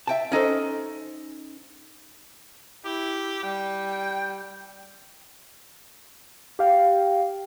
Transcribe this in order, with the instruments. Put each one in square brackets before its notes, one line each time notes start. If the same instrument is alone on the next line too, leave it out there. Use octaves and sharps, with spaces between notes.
[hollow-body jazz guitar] E5 G5 A5
C#4 D#4 A4 C5
[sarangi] E4 [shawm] G4
[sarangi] G3 [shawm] G5
[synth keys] G4 F5 G5